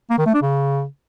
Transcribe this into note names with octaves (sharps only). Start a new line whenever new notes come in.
A#3
D#3
A3
D4
C#3